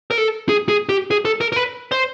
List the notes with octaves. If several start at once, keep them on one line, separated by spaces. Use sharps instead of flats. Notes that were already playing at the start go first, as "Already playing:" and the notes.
A#4
A4
G#4
G#4
G4
G#4
A4
A#4
A#4
B4
C5